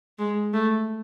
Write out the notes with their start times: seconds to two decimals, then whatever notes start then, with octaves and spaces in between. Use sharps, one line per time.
0.18 G#3
0.53 A3